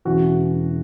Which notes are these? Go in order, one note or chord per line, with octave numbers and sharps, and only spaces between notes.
E1 E2 C#3 E3 F#4